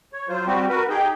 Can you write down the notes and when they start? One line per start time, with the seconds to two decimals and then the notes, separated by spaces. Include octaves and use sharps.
0.13 C#5
0.28 F#3 F4 C5
0.46 G3 C4 F#4 G4
0.69 F#4 A#4 B4
0.89 D#4 G4 G#4 G5